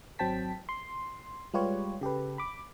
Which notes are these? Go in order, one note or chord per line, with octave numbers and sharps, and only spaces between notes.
G#1 F#3 C4 G5 A5 B6
C6
G3 G#3 F4 G4 B4 C#5
C#3 G4 A4 B4
B5 D6